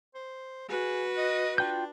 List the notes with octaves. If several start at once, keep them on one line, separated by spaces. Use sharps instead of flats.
C5
F#4 G#4 B4
D#5
D4 F4 G5 G6